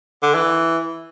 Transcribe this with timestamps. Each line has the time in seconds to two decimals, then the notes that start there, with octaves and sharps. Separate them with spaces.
0.23 D3
0.35 E3